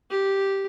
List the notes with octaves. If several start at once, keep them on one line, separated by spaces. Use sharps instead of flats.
G4